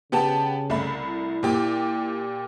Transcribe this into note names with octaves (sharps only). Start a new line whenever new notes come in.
C#3 B3 G4 A5
C2 A3 B5
E4
A#2 G4 D6